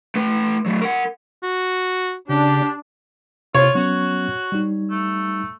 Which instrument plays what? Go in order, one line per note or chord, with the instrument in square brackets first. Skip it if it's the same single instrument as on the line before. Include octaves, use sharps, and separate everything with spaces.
[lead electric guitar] A3 B4
F#3 A3
A#4 F#5
[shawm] F#4
[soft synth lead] C#3 [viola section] D4 [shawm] G4
[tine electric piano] C3 [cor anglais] F4 [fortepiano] C#5
[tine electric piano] F#3 B3 C#4 [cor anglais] F#4
[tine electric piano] G3 D#4
[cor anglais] A3